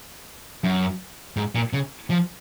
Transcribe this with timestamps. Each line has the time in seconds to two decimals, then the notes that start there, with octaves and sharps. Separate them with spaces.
0.64 F#2
1.37 G#2
1.55 A#2
1.73 C#3
2.10 F3